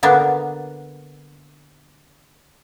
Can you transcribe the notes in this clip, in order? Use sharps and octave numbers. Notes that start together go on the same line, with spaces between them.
D3 A#3 B3 D4